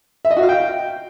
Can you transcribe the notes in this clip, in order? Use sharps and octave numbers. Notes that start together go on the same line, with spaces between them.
E5
D#5
F#4
F5
G5